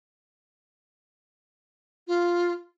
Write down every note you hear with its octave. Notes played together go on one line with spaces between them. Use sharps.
F4